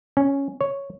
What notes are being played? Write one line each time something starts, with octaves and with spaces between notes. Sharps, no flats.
C#4
C#5